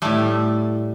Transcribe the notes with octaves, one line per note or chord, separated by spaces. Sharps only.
A2 G3 A3